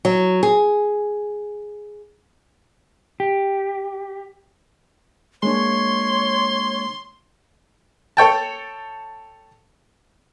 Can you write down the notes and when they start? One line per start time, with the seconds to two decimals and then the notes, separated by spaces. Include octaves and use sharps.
0.05 F#3
0.43 G#4
3.20 G4
5.43 G#3 A#3 D4 C#5 C6
8.17 A4 C#5 G5 A5